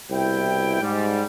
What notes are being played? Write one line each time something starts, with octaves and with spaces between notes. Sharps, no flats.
C2 B2 E4 G5
G#2 G3